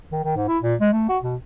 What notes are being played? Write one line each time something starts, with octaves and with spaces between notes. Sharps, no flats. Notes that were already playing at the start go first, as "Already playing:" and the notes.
D#3
D#3
G#2
E4
A#2
G#3
A3
F#4
B2